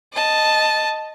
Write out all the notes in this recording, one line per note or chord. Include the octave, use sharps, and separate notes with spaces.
D#5 A5